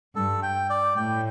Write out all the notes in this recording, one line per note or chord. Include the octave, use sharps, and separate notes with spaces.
G2 A4
G5
D5
A2 G5